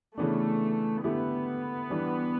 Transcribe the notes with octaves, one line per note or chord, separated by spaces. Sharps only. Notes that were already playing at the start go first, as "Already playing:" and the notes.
C#3 E3 A3 B3 D4
D3 A3 B3 E4 G4
E3 G3 D4